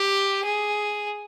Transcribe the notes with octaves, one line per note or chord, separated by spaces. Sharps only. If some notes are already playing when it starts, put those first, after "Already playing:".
Already playing: G4
G#4